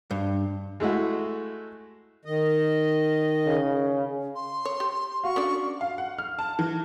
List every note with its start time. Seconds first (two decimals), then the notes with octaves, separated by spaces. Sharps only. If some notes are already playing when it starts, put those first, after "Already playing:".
0.11 G2
0.80 G#3 A3 E4 F#4
2.25 D#3 D#5
3.47 C#3
4.35 C6
4.65 C#5
4.80 G4
5.24 F#4 F5 C#6
5.36 C#4 D4 D5
5.81 F5
5.98 F#5
6.19 F6
6.39 A5
6.59 E3